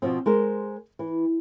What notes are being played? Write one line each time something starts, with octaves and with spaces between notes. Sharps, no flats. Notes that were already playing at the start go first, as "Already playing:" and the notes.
B2 F3 C4
G#3 A#4 C5
E3